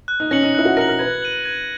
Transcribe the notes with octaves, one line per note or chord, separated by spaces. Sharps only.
F#6
D#4
C#4 A#6 C#7 F#7
D#4
E4 F#6
F#4
A#4 A#6 C#7 F#7
A#4
B4 G#6
D#7 F#7
G#6